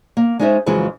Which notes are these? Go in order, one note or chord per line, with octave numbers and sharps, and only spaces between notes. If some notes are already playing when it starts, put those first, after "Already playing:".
A#3
G#3 C#4 D#4 F4 C5 E5
F2 C#3 E3 F#3 G#3 F4